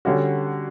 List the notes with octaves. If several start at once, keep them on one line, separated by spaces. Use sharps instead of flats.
D3 G3 C#4 F#4